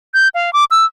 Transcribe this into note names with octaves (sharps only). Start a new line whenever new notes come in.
G6
F5
D6
E6